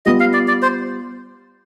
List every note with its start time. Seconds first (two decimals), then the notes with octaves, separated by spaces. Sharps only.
0.06 G3 B3 F4 D#5
0.20 F5
0.34 D5
0.48 D5
0.63 C5